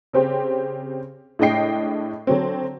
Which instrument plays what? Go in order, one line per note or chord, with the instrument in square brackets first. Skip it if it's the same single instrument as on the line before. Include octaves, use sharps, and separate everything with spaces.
[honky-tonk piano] C#3 C4 G4 C5
A2 G#3 D4 D#5 G5 C7
D3 F#3 C4